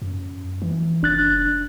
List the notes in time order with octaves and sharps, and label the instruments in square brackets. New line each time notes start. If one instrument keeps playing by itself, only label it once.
[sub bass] F#2
E3
[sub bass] F1 [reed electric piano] D4 F#6 A6